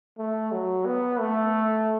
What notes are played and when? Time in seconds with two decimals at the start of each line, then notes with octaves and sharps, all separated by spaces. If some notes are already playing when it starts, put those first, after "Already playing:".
0.18 A3
0.52 F#3
0.86 B3
1.20 A3